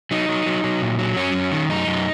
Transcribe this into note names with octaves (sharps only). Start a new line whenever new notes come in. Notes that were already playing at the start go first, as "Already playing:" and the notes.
F#3 D#4
F#3
F#3
F#3
A#2
F#3
F#2 C#4
F#2
D#3
F#2 D#4
F#2